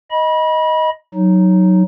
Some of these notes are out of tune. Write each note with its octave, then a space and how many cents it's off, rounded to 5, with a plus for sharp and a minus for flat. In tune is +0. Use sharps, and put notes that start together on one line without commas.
D#5 +10 B5 -25
F#3 +0 D#4 +0